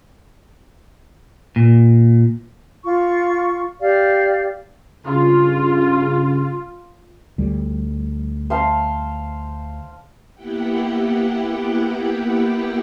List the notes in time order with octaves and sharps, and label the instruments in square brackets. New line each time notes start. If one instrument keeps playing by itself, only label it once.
[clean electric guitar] A#2
[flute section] F4 C#6
G4 D5 F5
[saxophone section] G2 C#3 [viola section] F4
[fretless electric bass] D2 G3
[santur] C5 F5 A5
[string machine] A#3 B3 E4 G4 F#5 G5